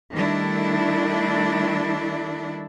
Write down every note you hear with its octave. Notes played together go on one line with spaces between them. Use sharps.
D#3 G3 A3 D4 E4